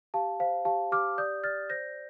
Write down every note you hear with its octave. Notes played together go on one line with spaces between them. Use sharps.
G4 F5 A5
C5 F5
G4 F5 A5
G4 D6 F6
D5 D#6 G6
D5 F6 A6
C5 G6 A#6